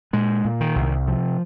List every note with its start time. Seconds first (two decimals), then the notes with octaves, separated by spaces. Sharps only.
0.13 A#2 G#3
0.45 A#2
0.61 D#3
0.76 C2
1.07 C3 F3